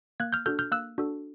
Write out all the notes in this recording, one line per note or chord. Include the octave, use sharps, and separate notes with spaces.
A#3 F#6 G#6
F6 G6
D4 F#4 A4 F6 G6
F6 G6
A#3 E6 F#6
D4 F#4 A4